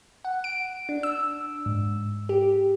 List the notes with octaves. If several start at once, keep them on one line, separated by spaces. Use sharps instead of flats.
F#5
D7
D4
E6
G#2
G4